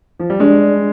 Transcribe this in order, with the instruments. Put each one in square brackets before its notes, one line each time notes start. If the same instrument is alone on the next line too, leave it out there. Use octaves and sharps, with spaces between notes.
[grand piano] F3
G3
[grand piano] G#3 [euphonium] D4